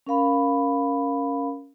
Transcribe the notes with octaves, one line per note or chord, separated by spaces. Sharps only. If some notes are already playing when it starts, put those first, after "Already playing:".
C#4 A#4 F5 B5